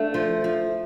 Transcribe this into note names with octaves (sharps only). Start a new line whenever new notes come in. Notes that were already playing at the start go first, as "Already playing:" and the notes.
Already playing: A3 D4
F3
F3